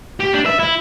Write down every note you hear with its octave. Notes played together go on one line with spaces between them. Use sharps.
G4
D4
E5
E4